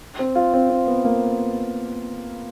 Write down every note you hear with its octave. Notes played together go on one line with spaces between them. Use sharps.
C4
F4
C4
C4
B3
A#3